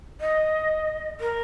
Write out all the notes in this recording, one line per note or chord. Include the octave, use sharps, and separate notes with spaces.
D#5
A#4